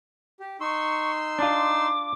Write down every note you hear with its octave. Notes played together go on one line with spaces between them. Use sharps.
G4
D#4 C6 C#6 E6
D4 F4 D6